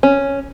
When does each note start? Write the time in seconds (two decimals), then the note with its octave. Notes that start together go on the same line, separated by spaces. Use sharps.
0.03 C#4